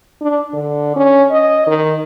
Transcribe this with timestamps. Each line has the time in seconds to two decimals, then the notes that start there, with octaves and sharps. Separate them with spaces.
0.21 D4
0.53 D3
0.96 C#4
1.31 D#5
1.67 D#3